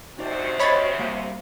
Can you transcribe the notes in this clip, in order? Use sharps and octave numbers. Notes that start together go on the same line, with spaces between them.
D2 C3 D#4 F#4 C5 D5
C#5 D#5 B5 A6
G3 A#3 F5